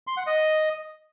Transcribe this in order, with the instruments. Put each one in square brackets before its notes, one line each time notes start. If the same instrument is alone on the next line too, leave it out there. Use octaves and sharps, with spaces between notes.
[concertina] C6
F#5
D#5